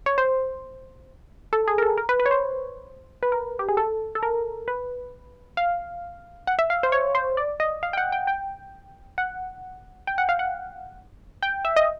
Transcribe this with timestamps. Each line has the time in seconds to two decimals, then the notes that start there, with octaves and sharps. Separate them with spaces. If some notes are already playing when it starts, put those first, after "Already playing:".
0.06 C#5
0.18 C5
1.53 A4
1.68 G#4
1.78 A#4
1.82 A4
1.98 A#4
2.09 B4
2.20 B4
2.26 C#5
2.31 C5
3.23 B4
3.32 A#4
3.59 G4
3.68 G#4
3.77 A4
4.15 A4
4.23 A#4
4.68 B4
5.57 F5
6.47 F#5
6.59 E5
6.70 F5
6.83 C5
6.92 C#5
7.15 C5
7.37 D5
7.60 D#5
7.83 F5
7.93 G5
7.97 F#5
8.12 G5
8.27 G5
9.18 F#5
10.07 G5
10.18 F#5
10.29 F5
10.39 F#5
11.43 G5
11.65 E5
11.76 D#5